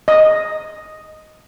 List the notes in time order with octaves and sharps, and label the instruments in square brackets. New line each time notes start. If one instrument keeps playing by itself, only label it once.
[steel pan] D#5 D#6